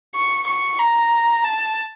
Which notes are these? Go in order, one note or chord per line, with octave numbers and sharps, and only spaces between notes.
C#6
C#6
A#5
A5